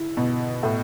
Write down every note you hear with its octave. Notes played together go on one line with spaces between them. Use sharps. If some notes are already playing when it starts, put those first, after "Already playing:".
Already playing: E4
B2
A2